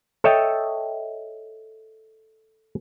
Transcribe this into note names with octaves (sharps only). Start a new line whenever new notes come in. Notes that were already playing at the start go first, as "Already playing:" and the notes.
A4 C#5 D#5 E5 G5 A5